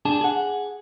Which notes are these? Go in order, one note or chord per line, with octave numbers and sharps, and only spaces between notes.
D4 G#4 A5
G#4 F#5